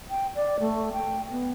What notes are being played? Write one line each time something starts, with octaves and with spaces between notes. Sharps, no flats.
G5
D5
A3
G5
B3